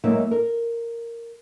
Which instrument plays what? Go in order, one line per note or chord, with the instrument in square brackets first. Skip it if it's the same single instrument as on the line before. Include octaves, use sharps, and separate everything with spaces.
[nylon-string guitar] F#3 G#3 A#3 D#4 E5
A#4